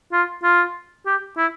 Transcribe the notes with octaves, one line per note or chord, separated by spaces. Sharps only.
F4
F4
G4
E4